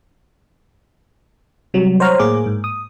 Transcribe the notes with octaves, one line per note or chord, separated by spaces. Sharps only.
C3 F#3 G3
C5 C#5 F#5 A#5 F6
A2 A#3 G#4 D6
G#2
D#6